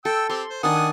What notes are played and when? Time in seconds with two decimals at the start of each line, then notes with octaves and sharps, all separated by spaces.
0.05 A4 G5 E6
0.30 C4 G4 A4 C6
0.50 C5
0.63 D#3 D4 F#5 G#5 D#6